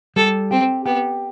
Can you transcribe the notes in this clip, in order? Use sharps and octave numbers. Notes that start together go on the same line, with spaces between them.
G3 A4
C4 G4
B3 G4